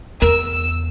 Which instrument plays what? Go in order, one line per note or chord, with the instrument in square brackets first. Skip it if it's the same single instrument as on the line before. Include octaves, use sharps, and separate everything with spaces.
[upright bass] E2 [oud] A#4 [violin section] E6